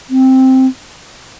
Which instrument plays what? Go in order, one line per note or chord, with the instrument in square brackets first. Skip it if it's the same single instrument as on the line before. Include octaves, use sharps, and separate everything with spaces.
[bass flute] C4